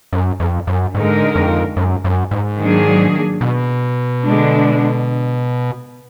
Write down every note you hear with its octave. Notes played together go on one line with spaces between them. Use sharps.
F#2
F2
F#2
G#2 D3 G#3 D#4 A#4
F2
F#2
F#2
G#2
D#3 F#3 A#3 D4 G#4
B2
D3 G#3 D4